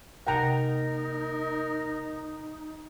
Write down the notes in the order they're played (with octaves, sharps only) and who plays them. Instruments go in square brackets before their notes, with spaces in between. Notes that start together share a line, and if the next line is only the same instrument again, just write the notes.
[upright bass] C3 A#3 [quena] D#4 [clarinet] A#4 [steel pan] F#5 G5 A#5